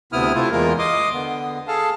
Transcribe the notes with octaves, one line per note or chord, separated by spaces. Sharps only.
D2 C3 B3 E4 D#6 F6
C3 A3 E4 F4
E2 G#3 A#3 F4 A#4
D#5 C6 D6 D#6
D3 B3
G#4 A4 F5 A5